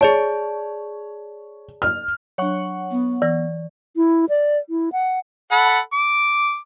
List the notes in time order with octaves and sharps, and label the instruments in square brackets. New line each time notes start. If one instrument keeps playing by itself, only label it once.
[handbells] G#4 D5 A5 [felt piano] C#5
[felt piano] F6
[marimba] F#3 D4 [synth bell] C#5 F#5 C#6
[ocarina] B3
[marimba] E3 E6 A#6 [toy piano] D5
[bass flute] E4
D5
E4
F#5
[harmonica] A4 F#5 B5
D6